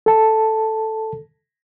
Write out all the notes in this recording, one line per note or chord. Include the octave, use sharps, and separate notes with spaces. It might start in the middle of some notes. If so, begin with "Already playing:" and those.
A4 A5